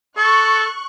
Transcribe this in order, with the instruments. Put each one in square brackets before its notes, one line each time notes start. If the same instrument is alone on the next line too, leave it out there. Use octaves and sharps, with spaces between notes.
[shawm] A4 [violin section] C#6 F#6